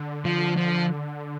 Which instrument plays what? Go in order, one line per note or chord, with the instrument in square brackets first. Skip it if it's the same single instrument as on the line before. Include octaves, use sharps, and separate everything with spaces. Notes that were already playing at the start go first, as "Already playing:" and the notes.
Already playing: [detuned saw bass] D3
[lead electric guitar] F3
F3